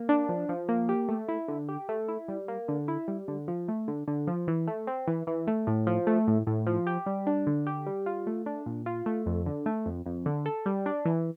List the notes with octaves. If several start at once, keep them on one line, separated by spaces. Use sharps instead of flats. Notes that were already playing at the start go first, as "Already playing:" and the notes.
Already playing: A#3
D4
F3
F3
A#3
G4
A3
E4
D3
G4
A3
E4
G3
A#3
D3
E4
G3
D3
F3
A3
D3
D3
F3
E3
A3
C4
E3
E3
A3
A2
F3
A3
A2
A2
F3
G4
G3
D4
D3
G4
G3
F4
A3
D4
A#2
F4
A3
F2
D3
A3
F2
F2
D3
A4
G3
D4
E3